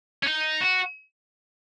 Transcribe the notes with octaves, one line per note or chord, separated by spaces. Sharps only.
C#4
D#4
F#4